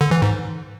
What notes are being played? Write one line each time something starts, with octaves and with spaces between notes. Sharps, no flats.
D3
E3
G#2